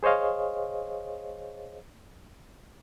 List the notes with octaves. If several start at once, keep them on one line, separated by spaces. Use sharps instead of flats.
G#4 C5 C#5 D#5 F5